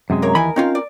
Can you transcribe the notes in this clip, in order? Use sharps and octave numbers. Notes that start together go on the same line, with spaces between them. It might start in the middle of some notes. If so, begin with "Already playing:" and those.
F#2 C3 G#3
A#3 A#4 C#5
D#2 E3 A#4 D#5 G#5 B5
C4 C#4 D#4 F4 F5
D5